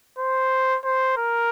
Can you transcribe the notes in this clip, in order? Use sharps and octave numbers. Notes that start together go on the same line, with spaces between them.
C5
C5
A#4